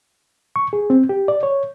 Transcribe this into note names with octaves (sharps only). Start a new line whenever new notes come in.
C#6
G#4
C4
G4
D5
C#5